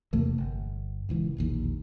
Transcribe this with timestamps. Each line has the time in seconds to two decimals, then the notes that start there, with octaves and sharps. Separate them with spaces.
0.13 E2 C3 A3 A#3
0.38 G1
1.09 D#1 C#2 E3
1.37 E1 A#1 D#2